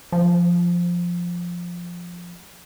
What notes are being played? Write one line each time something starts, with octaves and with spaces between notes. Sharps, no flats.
F3